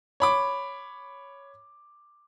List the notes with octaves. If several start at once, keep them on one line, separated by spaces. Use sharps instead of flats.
C#5 B5 D6